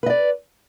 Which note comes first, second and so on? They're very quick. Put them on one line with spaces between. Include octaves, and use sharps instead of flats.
B4 D#5 D5